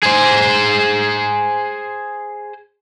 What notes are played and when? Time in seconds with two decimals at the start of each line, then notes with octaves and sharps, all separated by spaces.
0.03 G#4 C5